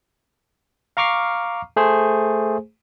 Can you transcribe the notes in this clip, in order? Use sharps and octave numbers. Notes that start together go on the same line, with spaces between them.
F5 A#5 C#6 D6 F6 C7
A3 G#4 C5